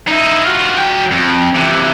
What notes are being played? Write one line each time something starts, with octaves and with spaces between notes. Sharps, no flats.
D#4 E4
F4 F#4
F#3 G5
F2
C3 E3